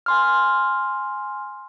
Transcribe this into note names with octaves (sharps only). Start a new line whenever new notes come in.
G#5 C6 F6